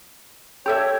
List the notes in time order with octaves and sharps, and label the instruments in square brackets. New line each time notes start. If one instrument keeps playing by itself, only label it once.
[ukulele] G4 A4 E5 [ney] C#5